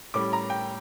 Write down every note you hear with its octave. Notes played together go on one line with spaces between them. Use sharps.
A2 G3 C#4 D6
A#5
G5